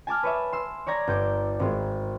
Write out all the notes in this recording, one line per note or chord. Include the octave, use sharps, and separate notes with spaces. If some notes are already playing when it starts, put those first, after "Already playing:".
G#5 A5 D6 F6
B4 C#5 E5
C6 E6
C#5 D5 A#5 G#6 A#6
G1 G6 D7
G#1 G#3